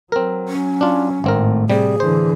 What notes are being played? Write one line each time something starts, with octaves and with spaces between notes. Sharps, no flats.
F#3 C4 A#4
C#4
D4 F4
G#1 A2 A3 C4 A#4
C3 G3 G#4
D3 E3 C5